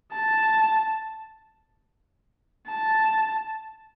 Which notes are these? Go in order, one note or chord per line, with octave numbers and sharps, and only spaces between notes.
A5
A5